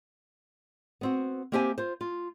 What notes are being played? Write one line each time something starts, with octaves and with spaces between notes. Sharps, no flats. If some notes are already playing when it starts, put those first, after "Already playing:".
B3 C4 F#4
A#3 C4 G4 C5 E5 G#5
F4 C5
F4